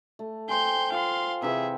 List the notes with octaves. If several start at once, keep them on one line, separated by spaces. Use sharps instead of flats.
A3
C5 G5 G#5 C6 G6
F4 F5 C6
C3 E3 G#4 E5